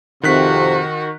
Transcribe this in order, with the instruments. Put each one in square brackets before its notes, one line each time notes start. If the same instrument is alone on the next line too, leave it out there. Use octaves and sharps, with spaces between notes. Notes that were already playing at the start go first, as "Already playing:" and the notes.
[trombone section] F2 C3 [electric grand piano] D#3 F#6 B6 [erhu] F#4